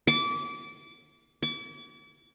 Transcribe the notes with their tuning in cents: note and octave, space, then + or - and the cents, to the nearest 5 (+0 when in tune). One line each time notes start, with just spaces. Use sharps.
D6 -25
D6 -40